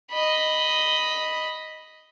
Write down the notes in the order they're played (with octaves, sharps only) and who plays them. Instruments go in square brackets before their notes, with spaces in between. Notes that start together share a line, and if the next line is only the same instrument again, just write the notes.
[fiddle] D#5 B5